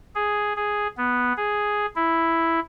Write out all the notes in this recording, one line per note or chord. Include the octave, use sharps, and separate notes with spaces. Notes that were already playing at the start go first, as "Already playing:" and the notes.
G#4
G#4
B3
G#4
E4